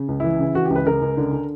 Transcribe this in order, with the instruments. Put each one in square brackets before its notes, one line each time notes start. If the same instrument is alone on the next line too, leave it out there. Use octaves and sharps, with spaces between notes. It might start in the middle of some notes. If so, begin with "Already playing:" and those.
Already playing: [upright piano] C#3
C#2
E3 E4
C#3
E3 F#4
G4
C#2
B4
C#3 A#4
C#2
D3
D3